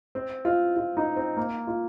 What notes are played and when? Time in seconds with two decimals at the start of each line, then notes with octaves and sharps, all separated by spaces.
0.15 C4
0.45 F4
0.77 F4
0.97 D#4
1.17 C4
1.37 A#3
1.67 F4